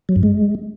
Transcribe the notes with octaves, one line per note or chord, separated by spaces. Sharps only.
F#3
G2
G#3